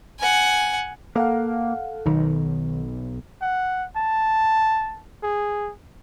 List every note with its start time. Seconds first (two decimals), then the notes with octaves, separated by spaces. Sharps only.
0.19 F#5 G#5
1.15 A#3 A4 F5 F#5
2.06 B1 D#3
3.42 F#5
3.96 A5
5.23 G#4